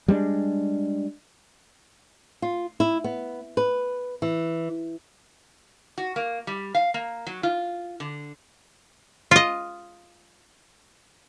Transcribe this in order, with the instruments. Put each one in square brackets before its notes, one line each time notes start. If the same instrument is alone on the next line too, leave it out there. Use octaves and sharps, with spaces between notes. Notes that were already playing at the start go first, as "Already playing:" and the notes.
[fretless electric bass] G3 G#3 C#4 D4
[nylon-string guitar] F4
E4
B3
B4
E3
[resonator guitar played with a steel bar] F#4
A#3
G3
F5
A#3
F#3
F4
D3
[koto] F4 D#5